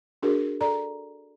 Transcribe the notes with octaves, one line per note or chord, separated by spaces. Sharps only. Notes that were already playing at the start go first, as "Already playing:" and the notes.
D4 F#4 G#4 A#4
A4 D5 A#5